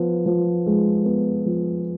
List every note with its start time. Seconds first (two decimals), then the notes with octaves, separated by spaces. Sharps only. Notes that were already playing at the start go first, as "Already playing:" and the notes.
Already playing: F3 B3
0.26 F3
0.66 G#3
1.05 B3
1.46 F3